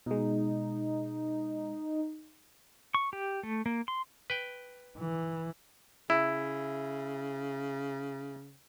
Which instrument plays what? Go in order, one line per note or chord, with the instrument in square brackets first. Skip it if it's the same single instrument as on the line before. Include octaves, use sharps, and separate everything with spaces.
[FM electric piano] B2 G#3 [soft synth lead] D#4
[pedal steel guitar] C#6
G4
A3
A#3
C6
[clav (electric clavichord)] B4 G5
[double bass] E3
[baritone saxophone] C#3 [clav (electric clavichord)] E4